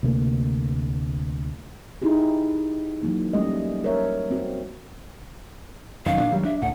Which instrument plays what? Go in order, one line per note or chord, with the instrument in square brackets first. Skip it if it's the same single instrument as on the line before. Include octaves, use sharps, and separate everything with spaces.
[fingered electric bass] D2 C3 A3 A#3
[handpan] D#4 E4 G4 G#4
E3 F#3 A#3 D#4
G3 A3 A#3 C#4 D#5
A#4 C#5 E5
C4 F#4
[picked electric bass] F1 F#2 D#3 [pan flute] F5
[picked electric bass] A#2 D4
D#3 F#3 G3
[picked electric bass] D4 [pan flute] E5
[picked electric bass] C#2 A2 [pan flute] F#5